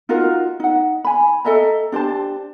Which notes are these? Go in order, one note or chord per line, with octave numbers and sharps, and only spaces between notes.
D#4 F4 F#4 A#4
D#4 F#5
G#5 B5
A4 D#5 E5 A#5
D4 G4 C5 A5